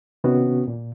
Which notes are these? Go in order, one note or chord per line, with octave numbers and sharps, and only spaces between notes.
C3 D#3 B3 C#4 F#4
A#2